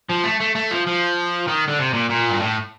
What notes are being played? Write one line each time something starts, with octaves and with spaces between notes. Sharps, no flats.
F3
A3
A3
A3
F3
F3
D#3
D3
C3
A#2
A#2
G2
A2